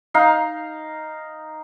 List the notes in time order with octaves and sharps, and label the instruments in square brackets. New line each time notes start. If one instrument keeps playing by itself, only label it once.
[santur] D#4 F5